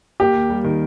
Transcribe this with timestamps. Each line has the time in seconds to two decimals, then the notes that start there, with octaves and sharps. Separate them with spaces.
0.20 A#3 G4
0.35 D#2
0.50 G3
0.64 D#3